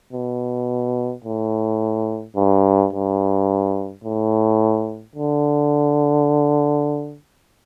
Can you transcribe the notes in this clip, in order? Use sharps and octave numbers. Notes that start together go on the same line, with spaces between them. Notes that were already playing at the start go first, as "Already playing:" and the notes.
B2
A2
G2
G2
A2
D3